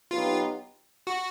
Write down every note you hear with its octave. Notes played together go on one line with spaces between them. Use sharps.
B2 F#3 B3 D#4 F4 G4
F#4